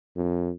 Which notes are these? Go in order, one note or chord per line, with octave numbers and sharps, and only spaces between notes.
F2